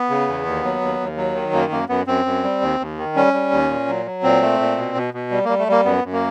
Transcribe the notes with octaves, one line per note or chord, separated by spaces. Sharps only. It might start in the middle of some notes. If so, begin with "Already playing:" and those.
Already playing: B3
C#3
E2
D#2
F#3
D#2
D#2
F#3
D#3
F#2 A#3
F#2 A#3
F#2 B3
F#2 C4
F#2
G3
D#2
D#2
D#3
G3 C#4
G3
D#2
A#2
F#3
F#3
A#2 C4
A3
A#2
B2
B2
B2
G3
G3 A#3
A3
G3 A#3
F#2 B3
F#2
A#3